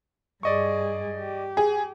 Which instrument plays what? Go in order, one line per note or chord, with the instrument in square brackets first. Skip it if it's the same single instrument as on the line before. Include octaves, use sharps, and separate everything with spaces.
[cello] G2 G#4 [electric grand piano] D5 D#5 C#6
[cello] G4
[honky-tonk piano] G#4